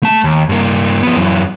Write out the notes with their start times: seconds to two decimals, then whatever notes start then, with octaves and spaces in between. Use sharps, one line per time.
0.03 A3 A5
0.24 D#2
0.49 G2 A#3
1.03 F3 B3
1.16 F#2 E3